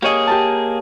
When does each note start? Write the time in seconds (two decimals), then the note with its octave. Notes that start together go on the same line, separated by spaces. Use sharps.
0.02 A#3 G4 G#4 C#5 D#5
0.27 G4 A#4 A5